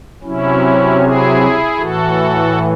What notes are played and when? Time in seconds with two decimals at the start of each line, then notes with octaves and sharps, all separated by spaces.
0.24 C3 F#3 C#4 E4
1.01 E4 G#4
1.78 A2 E3 F#4 A4